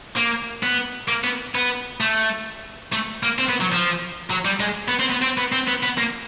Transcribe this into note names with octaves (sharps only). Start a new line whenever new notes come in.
A#3
B3
A#3
B3
B3
A3
A3
A#3
C4
B3
F#3
F3
F#3
G3
G#3
B3
C4
B3
C4
B3
C4
B3
B3
A#3